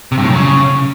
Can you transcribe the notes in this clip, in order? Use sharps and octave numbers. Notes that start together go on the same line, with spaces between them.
C3
G2
A2
F#2
C#3